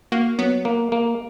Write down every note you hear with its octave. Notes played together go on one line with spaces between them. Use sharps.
A#3 F#4
F#3 B3
A#3
A#3